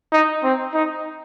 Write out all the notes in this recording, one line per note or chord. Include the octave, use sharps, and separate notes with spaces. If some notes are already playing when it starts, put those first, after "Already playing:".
D#4
C4
D#4